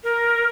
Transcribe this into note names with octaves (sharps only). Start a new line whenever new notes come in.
A#4